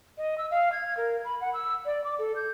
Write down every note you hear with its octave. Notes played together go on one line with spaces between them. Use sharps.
D#5
E6
F5
G#6
A#4
B5
F#5
E6
D5
D6
A4
G6